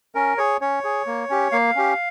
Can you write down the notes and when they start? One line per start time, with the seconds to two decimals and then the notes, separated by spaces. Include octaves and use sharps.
0.15 C#4 A#4
0.38 G#4 C#5
0.61 C#4 C#5
0.84 G#4
1.06 A#3
1.30 C#4 G4
1.52 A#3 F5
1.76 C#4 G4